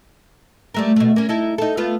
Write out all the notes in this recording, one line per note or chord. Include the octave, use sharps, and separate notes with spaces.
G3 A3 A#4
B2 A3
A#3 C#4
D#4 E4 A4
D#4 A4
A3 B3 F4